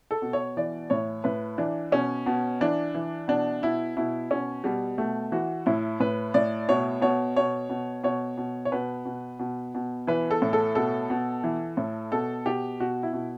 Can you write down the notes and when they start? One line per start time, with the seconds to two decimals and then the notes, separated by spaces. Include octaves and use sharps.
0.11 A4
0.22 B2
0.33 C#5
0.57 E3 D5
0.90 A2 C#5
1.24 A2 B4
1.58 E3 D4
1.92 B2 C#4
2.26 B2
2.61 E3 D4
2.94 E3
3.28 B2 D4
3.62 B2 E4
3.97 B2 E4
4.31 B2 C#4
4.64 B2 G3
4.98 B2 A3
5.32 E3 F#4
5.66 A2 E4
6.00 A2 B4
6.34 A2 D5
6.69 B2 C#5
7.02 B2 C#5
7.36 B2 C#5
7.70 B2
8.03 B2 C#5
8.37 B2
8.65 C#5
8.72 B2 B4
9.05 B2
9.39 B2
9.75 B2
10.07 E3 B4
10.31 A4
10.42 A2
10.53 A4
10.75 B2 A4
11.10 B2
11.44 E3
11.77 A2
12.12 B2 A4
12.46 B2 G4
12.80 B2 F#4
13.03 E4
13.13 B2